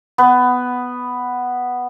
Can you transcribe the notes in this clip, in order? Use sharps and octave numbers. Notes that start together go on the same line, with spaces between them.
B3 B4